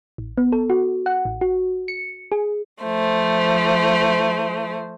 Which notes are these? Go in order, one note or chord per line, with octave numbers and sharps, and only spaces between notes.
A1
B3
A4
F#4
F#5
A1
F#4
C#7
G#4
F3 A3 C5